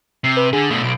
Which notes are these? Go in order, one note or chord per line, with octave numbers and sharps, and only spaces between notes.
C3 C7
B4
D3 G#4
B2 A3
B1 D7